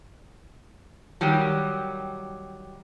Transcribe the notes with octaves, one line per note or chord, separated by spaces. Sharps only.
D#3 F#3 G3